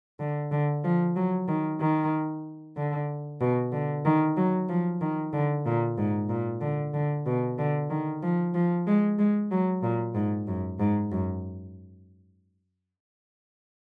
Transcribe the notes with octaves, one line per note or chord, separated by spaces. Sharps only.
D3
D3
F3
F#3
D#3
D#3
D3
B2
D3
D#3
F#3
F3
D#3
D3
A#2
G#2
A#2
D3
D3
B2
D3
D#3
F3
F3
G#3
G#3
F#3
A#2
G#2
F#2
G#2
F#2